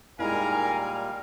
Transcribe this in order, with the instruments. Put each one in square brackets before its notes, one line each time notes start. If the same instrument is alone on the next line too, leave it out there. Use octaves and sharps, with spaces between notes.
[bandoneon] A#2 G3 F5 [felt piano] G#3 D#4 E4 [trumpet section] A#4 G#5